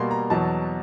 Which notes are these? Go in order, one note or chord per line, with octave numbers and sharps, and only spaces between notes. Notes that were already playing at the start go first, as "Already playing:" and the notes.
Already playing: B2 G3 A#3 C6
A#5
E2 B2 F#3 A5